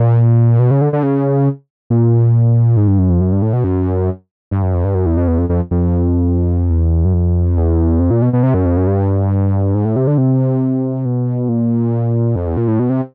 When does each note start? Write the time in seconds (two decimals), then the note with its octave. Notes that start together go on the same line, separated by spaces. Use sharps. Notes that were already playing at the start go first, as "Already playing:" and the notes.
Already playing: A#2
0.59 B2
0.71 C#3
0.81 D3
0.93 D3
1.03 C#3
1.90 A#2
2.77 G#2
2.88 G2
2.99 F#2
3.10 F2
3.21 F#2
3.32 G2
3.42 A2
3.53 B2
3.64 F#2
4.51 G2
4.62 F#2
4.74 F2
4.84 G2
4.95 F#2
5.06 E2
5.17 F2
5.28 E2
5.39 F2
5.49 F2
5.71 F2
6.70 E2
7.05 F#2
7.13 F2
7.57 E2
8.00 F2
8.11 A#2
8.22 B2
8.33 B2
8.43 C3
8.54 F#2
8.65 F2
8.77 F#2
8.87 G2
9.75 G#2
9.85 A2
9.96 C3
10.07 D3
10.18 C3
11.05 B2
11.49 A#2
12.36 F2
12.47 E2
12.57 A#2
12.68 A2
12.79 B2
12.90 C3